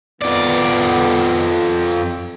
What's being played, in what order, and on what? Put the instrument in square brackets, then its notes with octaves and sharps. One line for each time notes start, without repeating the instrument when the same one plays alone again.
[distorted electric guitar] F2 D5 [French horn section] D#3 B3